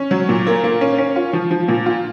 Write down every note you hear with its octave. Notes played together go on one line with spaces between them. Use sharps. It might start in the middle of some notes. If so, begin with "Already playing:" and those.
Already playing: C#4
F#3
A#2
A#3
A#3
C#4
C#4
F4
F3
F3
A#2
F4